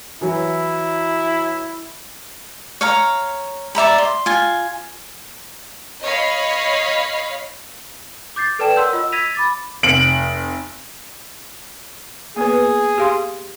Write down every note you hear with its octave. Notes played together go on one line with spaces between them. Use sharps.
E3 F#3 E4
C#5 F5 A#5
D5 E5 A#5 B5
C6
F4 G#5
C#5 D#5 F5 B5
D6 G6 A6 C7
A4 B4 D5 G5 A5 E7
A#4 C#5 F#5 C6 E6 G6
F4 D#5 E6
E6 G#6 A#6 B6 D#7 F7
B5 D6 A6
F1 D7 F#7
A#3 B3 G#4 B4
G4 F5 C6